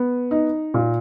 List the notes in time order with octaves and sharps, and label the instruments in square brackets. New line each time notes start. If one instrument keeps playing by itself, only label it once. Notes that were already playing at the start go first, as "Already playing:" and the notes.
Already playing: [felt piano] B3
D#4
A#2